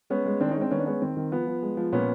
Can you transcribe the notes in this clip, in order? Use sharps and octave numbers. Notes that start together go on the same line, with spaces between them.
G#3 B3 C#4
G#3
D#3 C4 D4
C#4 D#4
G#3 C4 D4
D#3 B3 C#4
D4
G#3 B3 C#4
D#3 C4
D#3
F3 B3
F3
G#3
F3
A#2 B3 C#4